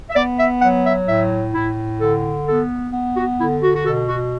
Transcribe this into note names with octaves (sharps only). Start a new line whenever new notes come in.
E5
B3 D5
E5
F#3 F#5
E5
A2 E5
A2 E4
D3 A4
B3 A4
B3
F#4
D3 E4
F#4
F#4
B2 A4
F#4